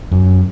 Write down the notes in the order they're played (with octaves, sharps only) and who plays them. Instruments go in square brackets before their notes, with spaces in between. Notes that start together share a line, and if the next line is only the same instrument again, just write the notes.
[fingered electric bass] F#2